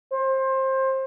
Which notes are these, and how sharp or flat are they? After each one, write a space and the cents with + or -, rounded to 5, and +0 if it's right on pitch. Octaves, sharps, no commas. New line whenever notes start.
C5 +25